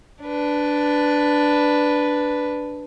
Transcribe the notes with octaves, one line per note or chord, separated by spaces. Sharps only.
D4 B4